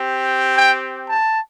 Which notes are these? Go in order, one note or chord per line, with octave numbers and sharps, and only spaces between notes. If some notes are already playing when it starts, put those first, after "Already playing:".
Already playing: C4 G4
G5
A5